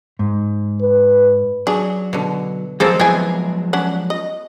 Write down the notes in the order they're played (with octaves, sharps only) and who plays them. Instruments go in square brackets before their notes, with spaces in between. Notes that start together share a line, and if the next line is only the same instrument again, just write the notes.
[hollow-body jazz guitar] G#2
[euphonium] B4
[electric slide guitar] F#3 [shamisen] D4 G#4
[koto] B2 D3
[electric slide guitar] F3 F#3 G#3 [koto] A#3 C4 A4 [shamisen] G#4
[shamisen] E3 G#5 [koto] B3 G#4 G5
[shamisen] C#4 D4 F#5
D#5